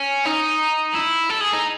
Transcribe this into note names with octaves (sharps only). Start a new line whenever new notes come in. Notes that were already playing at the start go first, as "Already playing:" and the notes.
Already playing: C#4
D#4
E4
A4
G#4
D#4